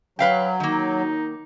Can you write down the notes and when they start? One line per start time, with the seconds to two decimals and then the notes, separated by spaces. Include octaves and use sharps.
0.19 F#3 B4 F5 G5
0.60 D#3 A#3 D#4